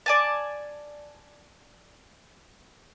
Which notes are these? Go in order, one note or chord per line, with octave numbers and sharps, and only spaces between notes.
D5 G#5 A5